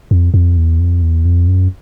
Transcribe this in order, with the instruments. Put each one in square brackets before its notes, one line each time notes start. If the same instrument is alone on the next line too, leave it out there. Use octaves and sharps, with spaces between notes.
[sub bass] F2
F2
E2
F2
E2
F2
F#2